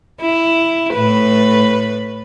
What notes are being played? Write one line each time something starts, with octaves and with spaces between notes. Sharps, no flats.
E4
A2 B4